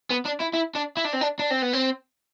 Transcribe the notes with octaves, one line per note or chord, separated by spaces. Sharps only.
B3
D4
E4
E4
D4
E4
D4
C4
D4
D4
C4
B3
C4